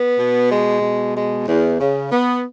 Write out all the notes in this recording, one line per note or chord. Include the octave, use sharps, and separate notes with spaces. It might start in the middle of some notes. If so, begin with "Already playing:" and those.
Already playing: B3
B2
G#3
B2
G#3
E2
C#3
B3